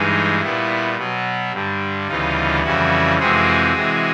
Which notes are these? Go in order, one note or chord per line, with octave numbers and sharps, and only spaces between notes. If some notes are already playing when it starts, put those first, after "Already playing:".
Already playing: G2 E3 G#3 D#4
A#2 G3 B3 E4
B2 F#3 B3
G2 D3 G3
D2 C#3 E3 G3 B3 D#4 F4
F2 C#3 E3 G3 E4 F#4
F2 C3 E3 G#3 C4 F#4 G#4
C3 E3 G#3